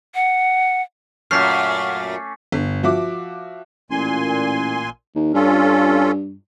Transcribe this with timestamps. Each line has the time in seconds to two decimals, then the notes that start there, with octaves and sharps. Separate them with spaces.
0.15 F#5
1.31 F#2 A#2 A3 C#4 D6 F6 B6 C7
2.52 G1
2.83 F3 F#4 E5 D6
3.91 A1 A#2 G#5 C6
5.15 D#2
5.34 G2 C#4 F4 A4